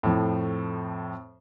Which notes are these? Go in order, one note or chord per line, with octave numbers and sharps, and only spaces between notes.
F2 A2